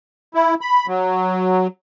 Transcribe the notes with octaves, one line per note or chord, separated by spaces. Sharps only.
E4
B5
F#3